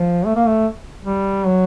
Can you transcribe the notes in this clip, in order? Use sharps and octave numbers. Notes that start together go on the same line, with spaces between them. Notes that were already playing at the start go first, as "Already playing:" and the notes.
Already playing: F3
A3
A#3
A3
G3
F#3